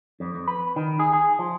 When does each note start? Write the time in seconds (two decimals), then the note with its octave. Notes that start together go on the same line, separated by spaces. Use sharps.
0.20 F2
0.35 F2
0.48 B4
0.76 D#3
1.00 G#4
1.13 G#4
1.39 F3